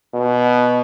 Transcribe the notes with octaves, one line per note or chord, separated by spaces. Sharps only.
B2